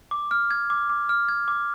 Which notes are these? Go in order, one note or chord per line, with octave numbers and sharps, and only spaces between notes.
D6
F6
G#6
D6
D6
F6
G#6
D6